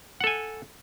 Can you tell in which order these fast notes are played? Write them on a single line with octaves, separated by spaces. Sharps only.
F#5 A4 G#5